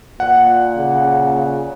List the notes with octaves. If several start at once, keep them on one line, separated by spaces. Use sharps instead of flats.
A#2 F#5
C#3